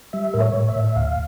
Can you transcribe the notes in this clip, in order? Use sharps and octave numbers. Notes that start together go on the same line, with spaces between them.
G3 E5
A2 A#4
C#5
A2
E5
A2
E5
D2 F5